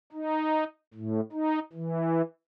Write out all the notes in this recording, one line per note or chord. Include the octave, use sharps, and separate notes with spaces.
D#4
A2
D#4
E3